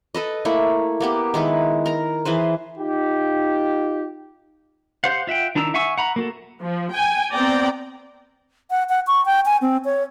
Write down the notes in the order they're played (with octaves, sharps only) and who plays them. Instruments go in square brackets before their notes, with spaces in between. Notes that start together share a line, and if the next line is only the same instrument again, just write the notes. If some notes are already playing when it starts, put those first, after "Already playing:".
[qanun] A4 B4 D#5
A3 A#3 E4
A#3 B3 G4
D#3 G#3 E4 B4
A#4 A#5
E3 G#4 B4 C5
[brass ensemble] D#4 F4 G4
[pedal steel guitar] G4 C5 F5 F#5
F4 E5 F#5 G5
D#3 D4 E4 A#5 E6
E5 F#5 G#5 C#6 E6
F#5 A#5 B5
A#3 F#4 A4
[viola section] F3
G5 G#5
B3 C4 D5 G5 A#5
[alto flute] F#5
F#5
C#6
G5
G#5
C4
C#5